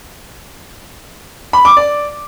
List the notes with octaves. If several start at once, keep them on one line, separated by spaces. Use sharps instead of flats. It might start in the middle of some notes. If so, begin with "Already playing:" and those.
B5
D6
D5